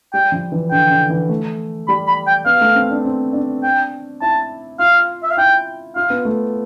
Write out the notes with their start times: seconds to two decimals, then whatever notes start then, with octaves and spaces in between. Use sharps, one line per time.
0.13 G3 G5
0.32 F3
0.52 E3
0.71 D3 G5
0.91 D3
1.10 E3
1.29 A3
1.88 G3 B5
2.07 B5
2.27 G5
2.46 B3 F5
2.61 A3
2.75 C4
2.91 D4
3.05 C4
3.33 D4
3.63 G5
4.21 E4 A5
4.79 F4 F5
5.23 E5
5.31 F5
5.37 E4 G5
5.96 F4 F5
6.10 B3
6.25 A3